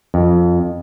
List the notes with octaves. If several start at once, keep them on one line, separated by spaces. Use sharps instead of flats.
F2